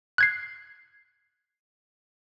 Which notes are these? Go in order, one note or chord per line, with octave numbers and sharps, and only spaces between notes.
F#6 G#6 C7